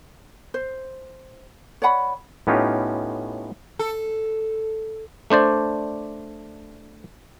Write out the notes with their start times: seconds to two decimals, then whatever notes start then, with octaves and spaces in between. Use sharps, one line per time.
0.54 C5
1.82 C#5 D5 F#5 B5
2.47 A2 B3 C#4 D#4 F4 G4
3.79 A4
5.30 A3 D4 C5 D5